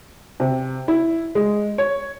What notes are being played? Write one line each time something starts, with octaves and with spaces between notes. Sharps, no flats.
C3
E4
G#3
C#5